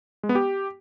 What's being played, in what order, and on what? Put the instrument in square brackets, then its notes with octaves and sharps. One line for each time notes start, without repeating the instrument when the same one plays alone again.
[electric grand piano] G#3
B3
G4